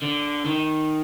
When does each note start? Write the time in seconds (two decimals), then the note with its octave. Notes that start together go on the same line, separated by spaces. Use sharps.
0.02 D3
0.46 D#3